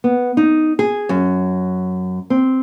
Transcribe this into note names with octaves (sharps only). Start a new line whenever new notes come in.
B3
D#4
G#4
F#2
C4